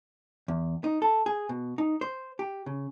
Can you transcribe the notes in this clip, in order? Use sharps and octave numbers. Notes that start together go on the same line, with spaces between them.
E2
D#4
A4
G#4
B2
D#4
C5
G4
C#3